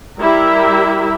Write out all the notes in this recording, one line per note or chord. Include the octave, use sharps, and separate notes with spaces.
G3 E4 G4 A#4 E5